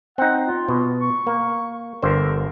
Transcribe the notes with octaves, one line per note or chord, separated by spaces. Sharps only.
C4 D#4 F#5
F4
B2
C#6
A#3
G1 D3 A#4 C5